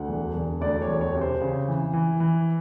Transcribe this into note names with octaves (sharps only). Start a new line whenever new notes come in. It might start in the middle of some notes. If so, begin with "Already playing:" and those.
Already playing: D2 F#5
E1
E1
D2 D5
C#5
E1
C#5
C3
C5
C#3
E3
E3
E3